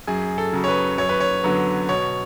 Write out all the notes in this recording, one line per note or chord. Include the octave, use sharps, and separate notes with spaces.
F#2 G#4
A4
C#3 F#3
C#5
B4
F#2 C#5
B4
C#5
D3 F#3 B3
B2 C#5